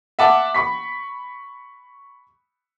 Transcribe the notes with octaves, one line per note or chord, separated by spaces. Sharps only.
E5 F#5 A5 D6
B5 C#6 B6